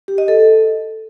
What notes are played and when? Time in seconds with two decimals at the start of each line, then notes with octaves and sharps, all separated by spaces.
0.08 G4
0.18 D#5
0.28 A4